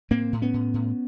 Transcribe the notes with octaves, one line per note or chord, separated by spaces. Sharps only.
A2 A#3 C4
A2
B3 C#4
A2
A2